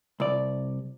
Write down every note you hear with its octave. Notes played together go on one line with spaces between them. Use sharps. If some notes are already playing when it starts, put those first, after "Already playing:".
C2 D5